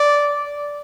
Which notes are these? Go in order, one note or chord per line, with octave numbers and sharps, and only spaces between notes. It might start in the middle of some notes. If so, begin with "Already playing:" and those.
Already playing: D5